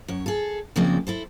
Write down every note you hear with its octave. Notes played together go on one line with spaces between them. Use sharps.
F#2 C#5
G#4 A4
C#3 F3 G#3 A#3 C4 D5
E4 A4 C5